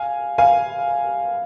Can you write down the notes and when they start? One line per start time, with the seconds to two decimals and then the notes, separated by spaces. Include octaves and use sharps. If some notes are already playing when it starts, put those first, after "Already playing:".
Already playing: F5 G#5
0.38 F5 G#5